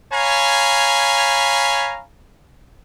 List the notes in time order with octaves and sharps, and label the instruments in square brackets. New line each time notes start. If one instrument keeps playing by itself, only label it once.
[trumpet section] C#5 F5 G#5 A#5 B5